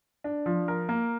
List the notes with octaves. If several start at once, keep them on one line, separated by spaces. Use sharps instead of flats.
D4
F3
A#4
A#3